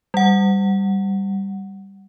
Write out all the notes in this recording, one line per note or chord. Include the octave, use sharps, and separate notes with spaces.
G3 F#5